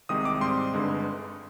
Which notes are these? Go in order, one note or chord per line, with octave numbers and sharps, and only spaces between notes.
C2 C3 D#3 G#3 C4 D#6
D6
G#2 G3 C4 C6
G1 G2 D3 G#3